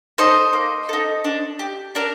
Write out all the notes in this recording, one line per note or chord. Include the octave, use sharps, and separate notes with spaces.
D#4 A4 C5 D#5
A#3
D#4 A4
D4
G4
D4 A#4